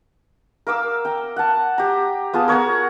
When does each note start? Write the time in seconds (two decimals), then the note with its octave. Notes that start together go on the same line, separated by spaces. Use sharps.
0.67 A#4 F5 D6 E6
1.05 G5 A#5
1.36 F#5 A5
1.78 G4 A#5
2.33 B3 F4 G#4 A5
2.48 A#4 C#5 F#5 A#5